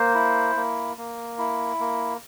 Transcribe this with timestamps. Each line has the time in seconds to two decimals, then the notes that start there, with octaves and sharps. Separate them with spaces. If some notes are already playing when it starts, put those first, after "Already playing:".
Already playing: A#3 C5
0.15 E4
0.56 A#3
0.97 A#3
1.38 E4
1.80 A#3